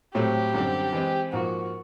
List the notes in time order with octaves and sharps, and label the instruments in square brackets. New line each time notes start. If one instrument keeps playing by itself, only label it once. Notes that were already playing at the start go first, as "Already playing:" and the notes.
[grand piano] A2 F#3 A3 C4 [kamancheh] G4
[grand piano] F#2 D3 G3 C4
E3 G#3 C4
[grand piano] G#2 F3 A#3 [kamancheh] F#4